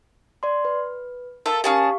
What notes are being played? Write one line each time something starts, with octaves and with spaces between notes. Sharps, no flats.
D5 C6
B4
F4 A4 A#4 E5
C#4 G4 G#4 F5 A5 C#6